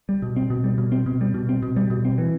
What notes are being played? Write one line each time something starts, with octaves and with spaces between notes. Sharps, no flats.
G3
B2
C4
B2
G3
B2
C4
B2
G3
B2
C4
B2
G3
B2
C4
E3